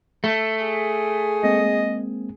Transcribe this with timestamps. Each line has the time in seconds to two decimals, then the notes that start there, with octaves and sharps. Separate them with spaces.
0.24 A3
0.64 G#4
1.43 G#3 A#3 C4 D#5